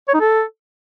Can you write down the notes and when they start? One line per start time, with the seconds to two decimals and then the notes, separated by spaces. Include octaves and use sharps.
0.08 C#5
0.14 D#4
0.20 A4